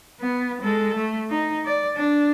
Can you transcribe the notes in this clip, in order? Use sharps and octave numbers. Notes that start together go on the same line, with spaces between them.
B3
G#3 A4
A3
D#4
D5
D4